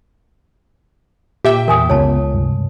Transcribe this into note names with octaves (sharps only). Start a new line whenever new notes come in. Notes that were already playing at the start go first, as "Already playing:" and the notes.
A#2 G4 E5 G5
E2 E3 A#4 G#5 D#6
F#1 C#2 C#3 B3 C#5 A5
G2 C3 G3